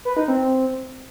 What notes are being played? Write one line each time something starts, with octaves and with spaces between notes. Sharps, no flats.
B4
D#4
C4